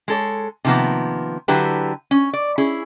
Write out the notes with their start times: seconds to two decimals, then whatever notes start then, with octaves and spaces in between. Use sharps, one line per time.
0.08 G#3 A4 C#5
0.65 C3 D#3 F3 A#3 B3
1.48 D3 F#3 E4 G4 B4
2.11 C#4
2.33 D5
2.58 C#4 E4 G#4